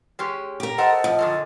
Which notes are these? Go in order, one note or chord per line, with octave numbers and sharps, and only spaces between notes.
G#3 C#4 G4
G4 A#4
A4 C5 D#5 F#5
F3
F#2 A#2 D3